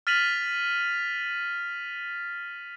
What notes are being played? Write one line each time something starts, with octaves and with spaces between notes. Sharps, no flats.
F6 A6 B6 D#7 F7 F#7